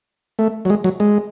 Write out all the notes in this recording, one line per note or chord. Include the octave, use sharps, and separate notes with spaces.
A3
F#3
G#3
F#3
G#3